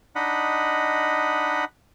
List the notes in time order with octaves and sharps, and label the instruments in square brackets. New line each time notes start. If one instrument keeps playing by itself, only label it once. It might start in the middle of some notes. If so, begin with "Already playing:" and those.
[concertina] D4 D#4 D#5 F#5 B5